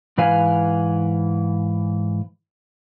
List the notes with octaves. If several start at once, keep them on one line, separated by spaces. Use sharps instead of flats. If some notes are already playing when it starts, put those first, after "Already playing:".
G#2 E3 B4 F5 G#5